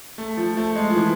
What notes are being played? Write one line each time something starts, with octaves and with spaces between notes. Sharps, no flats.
A3
F3
A3
G#3
F3
E3